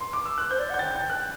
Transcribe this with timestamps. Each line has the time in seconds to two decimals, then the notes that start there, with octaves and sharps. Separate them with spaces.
0.01 C6
0.13 D6
0.26 E6
0.38 F#6
0.50 C5 G6
0.59 D5
0.70 F#5
0.74 G6
0.79 G5 A6
0.95 G6
1.10 F#6